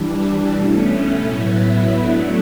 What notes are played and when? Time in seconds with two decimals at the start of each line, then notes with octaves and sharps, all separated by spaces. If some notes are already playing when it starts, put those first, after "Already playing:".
Already playing: E3 G3 D4
0.53 B2 A3 C#4
1.26 A2 F#3 B3 E4
2.00 F#3 A3 D4